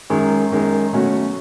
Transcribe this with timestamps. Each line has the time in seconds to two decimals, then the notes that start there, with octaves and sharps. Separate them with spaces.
0.10 F#2 D#3 G#3
0.51 F#2 D#3 G#3
0.92 B2 F#3 A3 C#4 F#4